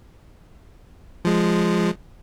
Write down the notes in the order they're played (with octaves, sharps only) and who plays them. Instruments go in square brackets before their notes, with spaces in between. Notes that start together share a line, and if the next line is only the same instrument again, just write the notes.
[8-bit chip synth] F3 G#3